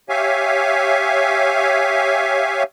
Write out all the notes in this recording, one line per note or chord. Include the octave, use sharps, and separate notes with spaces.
G4 C#5 E5 F5 G#5